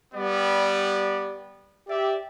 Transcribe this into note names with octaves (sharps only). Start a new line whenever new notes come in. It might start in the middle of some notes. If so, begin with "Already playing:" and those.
G3 B3 D5
G4 D5 E5